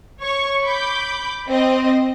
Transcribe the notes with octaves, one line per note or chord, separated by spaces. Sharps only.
C#5 C#6
B5 D6 G6
C4 D#5